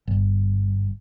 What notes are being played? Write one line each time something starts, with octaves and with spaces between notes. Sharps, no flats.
G1